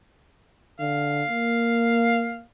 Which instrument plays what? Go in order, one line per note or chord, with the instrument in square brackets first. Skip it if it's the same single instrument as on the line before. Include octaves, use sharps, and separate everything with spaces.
[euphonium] D3 [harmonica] F5
[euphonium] A#3